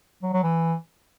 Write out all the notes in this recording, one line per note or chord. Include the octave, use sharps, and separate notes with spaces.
F#3
F#3
E3